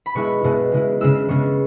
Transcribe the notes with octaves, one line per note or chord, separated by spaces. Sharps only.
B5
B2 G#3 E4 C#6
B2 G#3 E4
C#3 G#3 E4
C#3 G#3 E4 E6
C#3 G#3 B3 C#6